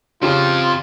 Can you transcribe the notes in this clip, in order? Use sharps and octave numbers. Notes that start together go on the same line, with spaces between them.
F2 C#3 F3 F4 G4